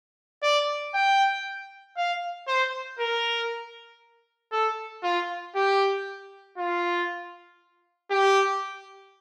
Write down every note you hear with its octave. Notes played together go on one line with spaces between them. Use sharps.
D5
G5
F5
C5
A#4
A4
F4
G4
F4
G4